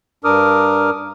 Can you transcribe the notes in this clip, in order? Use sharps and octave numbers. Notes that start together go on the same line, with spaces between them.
G2 D4 A#4 D6 D#6 F6